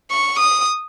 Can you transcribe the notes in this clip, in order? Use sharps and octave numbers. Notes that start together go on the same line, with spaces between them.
C#6
D#6